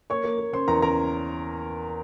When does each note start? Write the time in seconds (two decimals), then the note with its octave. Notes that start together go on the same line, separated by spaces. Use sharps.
0.10 A#3 C#5 C#6
0.24 A#3
0.38 A#3
0.52 C#3 C5 C6
0.68 E2 A#4 A#5
0.82 C#3 A#4 A#5